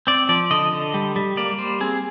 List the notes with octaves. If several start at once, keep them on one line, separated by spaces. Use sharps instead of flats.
C4 D5
F3 D5
D3 D#5
D3
G3
G3
A#3 D5
G3 C5
C4 G#4